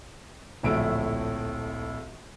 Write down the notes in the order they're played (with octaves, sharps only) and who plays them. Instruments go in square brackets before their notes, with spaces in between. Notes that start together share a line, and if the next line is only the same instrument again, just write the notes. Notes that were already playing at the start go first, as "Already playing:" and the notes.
[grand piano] D1 A#1 A2 E5 D7